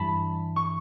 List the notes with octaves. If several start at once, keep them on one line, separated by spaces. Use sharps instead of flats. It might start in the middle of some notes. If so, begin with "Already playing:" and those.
Already playing: G2 E3 G3 A5 B5
C#6